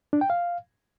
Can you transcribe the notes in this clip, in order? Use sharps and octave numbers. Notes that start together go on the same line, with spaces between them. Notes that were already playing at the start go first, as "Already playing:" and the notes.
D4
G5
F5